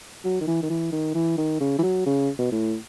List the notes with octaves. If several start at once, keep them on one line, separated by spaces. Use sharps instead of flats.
F#3
D#3
E3
D#3
E3
D#3
E3
D#3
C#3
E3
F#3
C#3
B2
A2